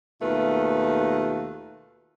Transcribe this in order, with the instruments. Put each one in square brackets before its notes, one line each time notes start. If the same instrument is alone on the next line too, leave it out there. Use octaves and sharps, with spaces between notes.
[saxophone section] D#2 B2 A3 F4 B4